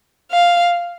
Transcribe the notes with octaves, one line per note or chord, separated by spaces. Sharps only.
F5